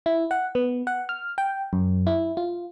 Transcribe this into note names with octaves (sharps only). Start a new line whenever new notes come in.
E4
F#5
B3
F#5
F6
G5
F#2
E4
F4